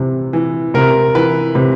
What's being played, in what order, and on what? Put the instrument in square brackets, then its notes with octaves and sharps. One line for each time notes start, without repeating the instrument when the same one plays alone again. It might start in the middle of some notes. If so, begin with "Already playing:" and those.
Already playing: [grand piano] C3 E3
E3
C3 A#4
E3 B4
C3 B4